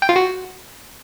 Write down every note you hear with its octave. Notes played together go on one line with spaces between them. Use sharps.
G5
F4
F#4